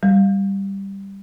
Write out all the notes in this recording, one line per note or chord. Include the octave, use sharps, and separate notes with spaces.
G3